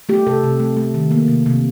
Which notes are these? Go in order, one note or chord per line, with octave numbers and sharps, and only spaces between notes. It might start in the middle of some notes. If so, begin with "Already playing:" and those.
A3 G4
C3 A4
C3
A3
A3
D#3
A#3
C3
C3